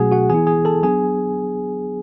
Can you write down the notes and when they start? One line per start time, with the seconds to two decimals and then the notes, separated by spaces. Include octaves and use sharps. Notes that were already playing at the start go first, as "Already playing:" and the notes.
Already playing: B2 F#3 A3 C#4 F#4 G#4 F#5 G#5
0.11 F#4 F#5
0.30 E3 B3 E4 G#4 G#5
0.47 G#4 G#5
0.65 A4 A5
0.82 F#3 B3 D4 G#4 G#5